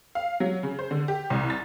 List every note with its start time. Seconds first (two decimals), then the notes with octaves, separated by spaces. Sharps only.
0.15 F5
0.40 F#3
0.63 C#3
0.79 C5
0.91 D3
1.08 G4
1.30 C2
1.50 A6